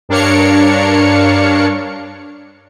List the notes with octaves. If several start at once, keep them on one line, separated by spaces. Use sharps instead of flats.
G2 D4 A#4 C#5 F5 C#7